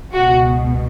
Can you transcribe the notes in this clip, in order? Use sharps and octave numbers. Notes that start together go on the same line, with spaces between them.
C#2 B2 F#4